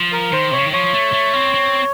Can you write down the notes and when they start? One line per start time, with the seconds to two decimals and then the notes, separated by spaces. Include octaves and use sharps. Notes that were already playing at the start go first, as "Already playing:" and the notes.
Already playing: F3
0.12 A#4
0.33 D#3 C5
0.51 C3 C#5
0.58 C#3
0.66 D#3
0.73 F3 C#5
0.94 A3
1.13 A3
1.34 C4
1.54 C4